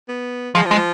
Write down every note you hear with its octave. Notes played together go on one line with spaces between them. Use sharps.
B3
F3 G#3
F3
G#3
F3